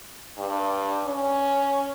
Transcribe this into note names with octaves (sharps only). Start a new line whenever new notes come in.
G2
C#4